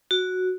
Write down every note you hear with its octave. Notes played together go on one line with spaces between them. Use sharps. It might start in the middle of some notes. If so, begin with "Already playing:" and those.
F#4